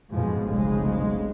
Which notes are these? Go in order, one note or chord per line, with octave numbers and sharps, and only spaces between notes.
F2 G#2 B2 F3 G#3
F1 B1 C#3 G#3